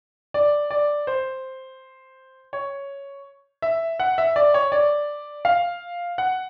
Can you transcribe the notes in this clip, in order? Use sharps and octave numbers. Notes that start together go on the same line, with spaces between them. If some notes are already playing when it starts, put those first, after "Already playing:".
D5
D5
C5
C#5
E5
F#5
E5
D5
C#5
D5
F5
F#5